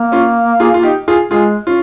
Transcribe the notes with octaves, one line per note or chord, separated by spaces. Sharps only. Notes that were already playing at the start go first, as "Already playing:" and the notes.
Already playing: A#3
C#4 F4
F4 G#4
F4
D#4 G4
F4 G#4
G#3 F4 G#4
C#4 F4